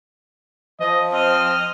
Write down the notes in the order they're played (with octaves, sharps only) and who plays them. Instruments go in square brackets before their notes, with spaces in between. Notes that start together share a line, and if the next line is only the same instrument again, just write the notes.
[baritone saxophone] F3 [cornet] D#5
[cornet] C4 [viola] D#5 [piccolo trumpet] F6